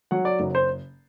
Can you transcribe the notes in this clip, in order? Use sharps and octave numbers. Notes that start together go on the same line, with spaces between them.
F#3 F#5
D5
F#1
C5